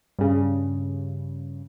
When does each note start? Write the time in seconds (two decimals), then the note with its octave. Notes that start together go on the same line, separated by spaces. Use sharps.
0.19 G2 C#3